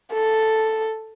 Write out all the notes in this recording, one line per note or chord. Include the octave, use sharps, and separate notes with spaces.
A4